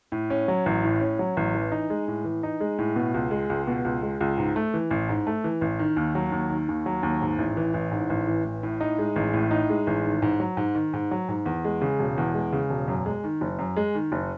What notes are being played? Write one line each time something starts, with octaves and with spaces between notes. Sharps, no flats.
A2
C#4
F#3
A1
A2
C#4
F#3
A1
E3
D#4
G#3
A2
E3
D#4
G#3
A2
B2
C#2
G#3
C#2
B2
C#2
G#3
C#2
G#2
A3
E3
A1
G#2
A3
E3
A1
D#3
D#2
F#3
D#2
D#3
D#2
F#3
D#2
G#2
A1
E3
A1
G#2
A1
E3
A1
A2
D#4
G#3
A1
A2
D#4
G#3
A1
D#3
G#2
F#3
G#2
D#3
G#2
F#3
G#2
E2
G#3
C#3
E1
E2
G#3
C#3
E1
F#2
G#3
D#3
F#1
F#2
G#3
D#3
F#1